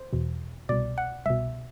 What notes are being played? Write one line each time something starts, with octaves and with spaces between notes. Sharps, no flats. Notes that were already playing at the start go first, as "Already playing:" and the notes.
Already playing: C5
E2 B2
C2 B2 D5
F#5
C2 B2 E5